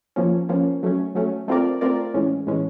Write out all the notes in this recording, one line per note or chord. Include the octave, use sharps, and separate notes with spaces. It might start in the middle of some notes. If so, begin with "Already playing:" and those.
F3 A#3 C#4
F3 A#3 C#4
F#3 A3 C#4
F#3 A3 C#4
A3 C4 F4 A#4 D5
A3 C4 F4 A#4 D5
A2 E3 G#3 C#4
A2 E3 G#3 C#4